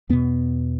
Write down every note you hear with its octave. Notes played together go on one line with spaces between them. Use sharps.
E2 B2 B3